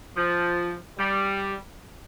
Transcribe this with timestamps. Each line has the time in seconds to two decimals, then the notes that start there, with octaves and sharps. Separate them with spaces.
0.17 F3
0.98 G3